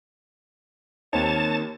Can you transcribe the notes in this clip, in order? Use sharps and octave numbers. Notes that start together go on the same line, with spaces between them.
D#2 A#3 C4 D#4 C#5 A5